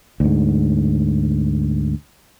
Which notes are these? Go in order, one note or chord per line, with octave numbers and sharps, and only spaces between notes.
D2 G#2